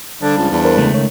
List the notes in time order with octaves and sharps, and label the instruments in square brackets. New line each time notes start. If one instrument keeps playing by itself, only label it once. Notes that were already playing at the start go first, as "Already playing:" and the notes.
[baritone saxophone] D3 [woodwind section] F3 G3 D4
[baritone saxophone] C#2 [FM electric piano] A5
[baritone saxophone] E2
[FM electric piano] A#4 C5
[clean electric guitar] C#2 A3
[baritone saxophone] D#3 [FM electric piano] C#5